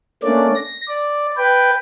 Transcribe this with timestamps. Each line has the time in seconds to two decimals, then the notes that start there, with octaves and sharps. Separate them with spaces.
0.23 A3 A#3 C#4 D4 D5
0.56 A#6
0.88 D5
1.37 B4 G5